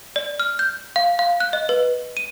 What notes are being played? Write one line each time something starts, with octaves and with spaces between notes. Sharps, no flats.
D5
F6
G6
F5
F5
F#6
D#5
B4
D#7